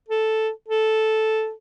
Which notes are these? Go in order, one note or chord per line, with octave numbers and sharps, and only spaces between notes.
A4
A4